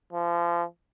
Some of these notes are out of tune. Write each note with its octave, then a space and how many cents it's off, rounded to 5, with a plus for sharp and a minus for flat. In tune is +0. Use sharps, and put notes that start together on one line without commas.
F3 -30